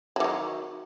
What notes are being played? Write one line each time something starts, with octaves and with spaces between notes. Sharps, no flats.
D#3 E3 F#3